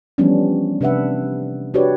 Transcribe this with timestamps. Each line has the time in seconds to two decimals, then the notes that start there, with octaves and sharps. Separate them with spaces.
0.18 E3 F3 G3 B3 C#4 D4
0.81 C3 D4 B4 E5 F#5
1.74 D4 F#4 G4 B4 C#5 D5